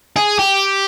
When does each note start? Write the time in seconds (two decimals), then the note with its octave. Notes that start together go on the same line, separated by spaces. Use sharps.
0.17 G#4
0.39 G4